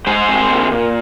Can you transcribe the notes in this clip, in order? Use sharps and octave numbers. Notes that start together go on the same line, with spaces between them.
G#3 G#4 C5
C4
A#2
A#2